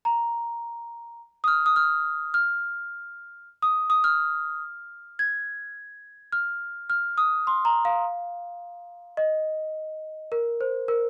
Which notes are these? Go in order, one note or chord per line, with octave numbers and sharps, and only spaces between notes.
A#5
D#6
F6
D#6
F6
F6
D#6
D#6
F6
G#6
F6
F6
D#6
C6
A#5
F5
D#5
A#4
C5
A#4